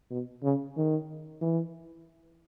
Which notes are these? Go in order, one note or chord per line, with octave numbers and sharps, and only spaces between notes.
B2
C#3
D#3
E3